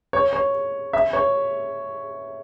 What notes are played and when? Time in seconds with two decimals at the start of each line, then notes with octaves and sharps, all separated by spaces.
0.13 C#5
0.33 C#5
0.93 E5
1.13 C#5